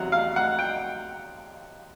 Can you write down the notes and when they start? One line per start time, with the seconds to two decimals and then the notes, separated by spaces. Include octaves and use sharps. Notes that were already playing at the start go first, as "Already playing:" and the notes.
Already playing: E2 C3 F#3 F#5
0.12 F5
0.36 F#5
0.59 G5